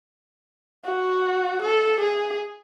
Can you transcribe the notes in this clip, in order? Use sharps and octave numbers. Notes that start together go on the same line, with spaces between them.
F#4
A4
G#4